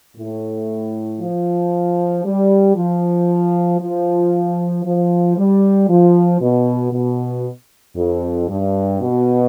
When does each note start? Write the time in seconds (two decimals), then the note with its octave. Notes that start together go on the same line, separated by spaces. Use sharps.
0.17 A2
1.20 F3
2.25 G3
2.76 F3
3.80 F3
4.84 F3
5.37 G3
5.89 F3
6.40 B2
6.92 B2
7.96 F2
8.48 G2
9.00 B2